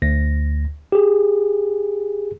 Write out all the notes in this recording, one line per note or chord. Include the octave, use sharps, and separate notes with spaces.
D2 A#6
G4 G#4